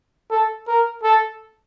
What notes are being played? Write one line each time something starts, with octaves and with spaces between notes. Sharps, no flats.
A4
A#4
A4